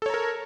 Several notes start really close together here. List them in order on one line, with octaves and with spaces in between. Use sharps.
A4 C#5 A#5 A#4